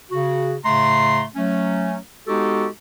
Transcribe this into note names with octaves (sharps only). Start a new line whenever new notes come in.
C#3 F#4
A2 C#3 A3 A#5 C6
F#3 A3 C#4
G#3 B3 D#4 F#4 G4 A4